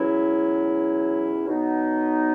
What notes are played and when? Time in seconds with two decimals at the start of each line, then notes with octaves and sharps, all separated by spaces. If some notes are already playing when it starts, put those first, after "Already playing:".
Already playing: E2 B2 F#3 C#4 E4
1.46 B2 F#3 B3 D#4